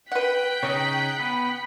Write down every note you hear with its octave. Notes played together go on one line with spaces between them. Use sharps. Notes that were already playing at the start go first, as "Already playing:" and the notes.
B4 F#5 G5 F#6 B6
C#3 D#4 C#5 D#6
B3